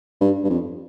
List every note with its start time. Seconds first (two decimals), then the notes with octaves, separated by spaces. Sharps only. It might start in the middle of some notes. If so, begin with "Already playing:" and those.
0.21 G2
0.44 G2
0.50 F2